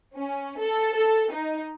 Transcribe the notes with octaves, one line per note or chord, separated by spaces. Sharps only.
C#4
A4
A4
D#4